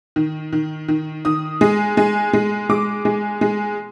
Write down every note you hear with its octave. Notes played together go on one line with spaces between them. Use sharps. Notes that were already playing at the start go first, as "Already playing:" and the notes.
D#3
D#3
D#3
D#3 D#6
G#3
G#3
G#3
G#3 D6
G#3
G#3